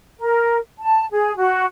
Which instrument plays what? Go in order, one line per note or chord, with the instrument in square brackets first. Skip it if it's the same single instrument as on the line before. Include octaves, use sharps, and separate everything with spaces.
[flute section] A#4
A5
G#4
F#4